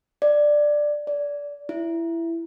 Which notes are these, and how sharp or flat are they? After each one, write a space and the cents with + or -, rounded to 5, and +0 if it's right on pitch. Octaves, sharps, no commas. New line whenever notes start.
D5 +10
D5 -20
E4 +15